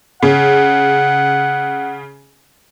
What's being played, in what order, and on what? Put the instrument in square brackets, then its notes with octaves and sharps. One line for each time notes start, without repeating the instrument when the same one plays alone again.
[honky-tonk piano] C#3 [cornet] F#5